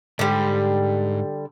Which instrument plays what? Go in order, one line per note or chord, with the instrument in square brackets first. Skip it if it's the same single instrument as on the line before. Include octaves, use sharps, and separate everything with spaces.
[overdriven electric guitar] G#2 [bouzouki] D3 G3